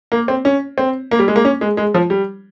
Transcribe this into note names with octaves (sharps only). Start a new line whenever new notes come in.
A#3
C4
C#4
C4
A#3
G3
G#3
A#3
C#4
G#3
G#3
F3
G3